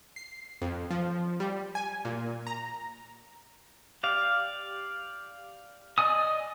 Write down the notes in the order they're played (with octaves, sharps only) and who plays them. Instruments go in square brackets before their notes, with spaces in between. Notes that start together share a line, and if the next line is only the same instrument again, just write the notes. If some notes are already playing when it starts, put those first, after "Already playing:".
[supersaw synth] C7
F2
F3
G3
G#5
A#2
A#5
[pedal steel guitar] G4 D5 F5
D5 D#5 G#5 D#6